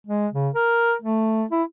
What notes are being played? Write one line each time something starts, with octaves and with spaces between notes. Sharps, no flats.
G#3
C#3
A#4
A3
E4